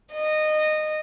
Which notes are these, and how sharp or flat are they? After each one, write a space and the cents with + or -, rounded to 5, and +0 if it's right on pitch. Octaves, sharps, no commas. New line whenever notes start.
D#5 -20